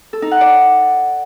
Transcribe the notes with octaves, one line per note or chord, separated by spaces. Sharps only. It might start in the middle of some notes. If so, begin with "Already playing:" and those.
A4
D#4
F#5
D5